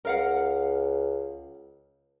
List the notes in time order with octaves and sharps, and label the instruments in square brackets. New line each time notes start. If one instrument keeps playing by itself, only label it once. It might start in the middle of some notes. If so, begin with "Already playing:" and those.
[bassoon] C#2 [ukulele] A#4 F5 F#5